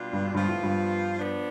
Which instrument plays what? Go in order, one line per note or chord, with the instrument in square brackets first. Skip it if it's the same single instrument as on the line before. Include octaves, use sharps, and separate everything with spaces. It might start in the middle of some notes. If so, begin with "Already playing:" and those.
Already playing: [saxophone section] B2 G3 D4 F4
[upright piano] G2
[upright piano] G2 [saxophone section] F3 B3 F4
[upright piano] A2
G2
[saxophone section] F3 B3 D4